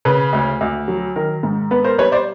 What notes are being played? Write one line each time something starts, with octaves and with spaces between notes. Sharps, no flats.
C#3 B4
D2
D2
F#3
D#3 A#4
G#2
B3 B4
A#4 C5
G3 B4 C#5
C5 D5